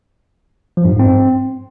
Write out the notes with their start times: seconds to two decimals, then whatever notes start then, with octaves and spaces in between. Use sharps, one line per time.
0.77 F3
0.85 G2
0.92 G#2
0.99 C4